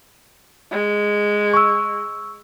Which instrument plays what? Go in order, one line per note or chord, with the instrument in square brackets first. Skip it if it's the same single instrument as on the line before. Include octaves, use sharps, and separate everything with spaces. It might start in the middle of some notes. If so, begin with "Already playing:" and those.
[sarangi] G#3
[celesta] C#6 E6